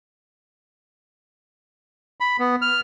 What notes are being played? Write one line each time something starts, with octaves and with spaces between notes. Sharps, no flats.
B5
B3
F6